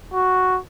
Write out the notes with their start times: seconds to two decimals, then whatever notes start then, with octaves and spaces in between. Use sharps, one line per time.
0.13 F#4